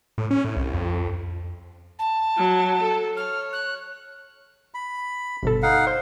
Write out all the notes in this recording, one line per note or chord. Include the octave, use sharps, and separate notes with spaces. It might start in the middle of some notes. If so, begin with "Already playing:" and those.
A2
C#4
A2
C2
F2
A5
F#3
A4
C#5 F6
F#6
B5
G1 B2 A4
D#4 F5 F#5
C5